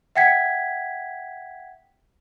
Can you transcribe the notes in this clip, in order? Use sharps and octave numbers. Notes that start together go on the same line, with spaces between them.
E5 F#5 G5 G#6 B6